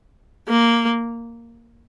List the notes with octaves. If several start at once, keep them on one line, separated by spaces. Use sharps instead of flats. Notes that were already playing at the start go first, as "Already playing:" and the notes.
A#3